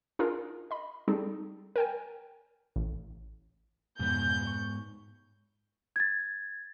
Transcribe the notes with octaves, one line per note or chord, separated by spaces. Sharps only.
D4 D#4 F4 G#4 A#4
D#5 B5
G3 C4 D#4 G#4 A4
A#4 G5 G#5
A1
F2 G#2 B2 B3 G6
C#6
G#6 A6